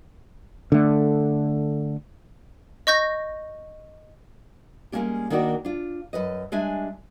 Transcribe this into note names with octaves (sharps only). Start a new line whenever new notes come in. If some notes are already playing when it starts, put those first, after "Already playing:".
D3 A3
D#5 C#6 G6 A#6
G3 G#3 A#3 C#4 D4 G4
D#3 A#3 D4 D#4 F#4 D5
D4 F4
F#2 B4 D#5
G3 G#3 D4 E5 G#5